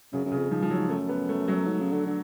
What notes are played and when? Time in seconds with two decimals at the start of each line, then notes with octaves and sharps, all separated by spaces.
0.13 F#2 C#3
0.25 F#2
0.32 C#3
0.38 F2
0.51 G#2 F3
0.62 G#2 F3
0.70 F#3
0.77 G#2
0.90 F#2 A3
1.09 B3
1.29 A3
1.48 F#3
1.68 G#2
1.81 C#3
1.93 D3
2.06 D3